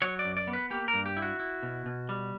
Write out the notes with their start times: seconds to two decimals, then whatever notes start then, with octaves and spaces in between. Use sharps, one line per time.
0.02 F#3 C#5
0.19 D5
0.25 F#2
0.37 D5
0.47 B3
0.53 B4
0.70 A#3 G4
0.88 A#4
0.94 G2
1.06 G4
1.17 E4
1.22 F#4
1.40 E4
1.63 B2
1.86 B2
2.09 G3